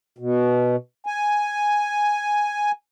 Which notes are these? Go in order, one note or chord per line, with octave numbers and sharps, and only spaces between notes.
B2
G#5